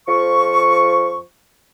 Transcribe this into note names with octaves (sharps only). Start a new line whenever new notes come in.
F2 F3 C#6